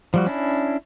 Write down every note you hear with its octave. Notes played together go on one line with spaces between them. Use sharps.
F3 G3 F#4
C#4 D4 E4